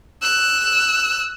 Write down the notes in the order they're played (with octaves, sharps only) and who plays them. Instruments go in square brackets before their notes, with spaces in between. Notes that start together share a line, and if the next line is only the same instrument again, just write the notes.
[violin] E6 F#6